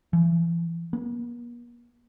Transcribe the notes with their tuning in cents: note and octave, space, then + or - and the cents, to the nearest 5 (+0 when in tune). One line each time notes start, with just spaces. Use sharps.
E3 +40
A#3 +45